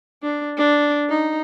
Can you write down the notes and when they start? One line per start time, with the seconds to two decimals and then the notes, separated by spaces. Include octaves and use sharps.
0.23 D4
0.57 D4
1.10 D#4